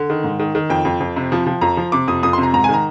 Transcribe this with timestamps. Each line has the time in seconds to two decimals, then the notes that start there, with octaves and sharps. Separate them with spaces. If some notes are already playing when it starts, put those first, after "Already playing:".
Already playing: D3
0.10 D#3
0.24 G#2
0.39 D#3
0.55 D#3
0.70 F2 G5
0.85 F2
1.00 F2
1.16 C3
1.32 F3
1.47 F3
1.61 F2 A#5
1.77 F3
1.92 C3 D6
2.08 F2 D#6
2.23 F2 D#6
2.33 C6
2.38 C3
2.43 A#5
2.53 G#2 A#5
2.64 G#5
2.69 D#3 A#5